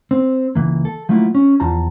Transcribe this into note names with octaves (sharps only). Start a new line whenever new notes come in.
C4
C#2 G#2 E3 A#3
A4
F3 F#3 A3 A#3 E4 F4
C#4
E2 F3 F4 A5 A#5